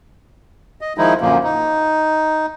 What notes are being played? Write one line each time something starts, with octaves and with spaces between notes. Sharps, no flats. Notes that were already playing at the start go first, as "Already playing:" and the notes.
D#5
D#3 F3 G#3 D#4 E4
F#2 A#2 D3 F3 A#3
D#4